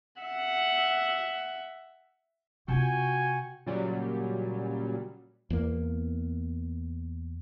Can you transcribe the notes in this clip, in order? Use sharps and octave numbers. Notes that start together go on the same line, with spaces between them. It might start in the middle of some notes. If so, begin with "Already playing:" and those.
E5 F#5
C3 F4 F#4 G5 G#5
A#2 C#3 F#3 G3
E2 A#3